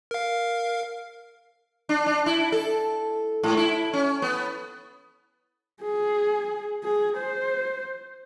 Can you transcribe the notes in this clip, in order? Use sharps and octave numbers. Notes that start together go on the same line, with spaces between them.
A#4 F5
D4
D4
E4
A4
G#2
E4
C#4
B3
G#4
G#4
C5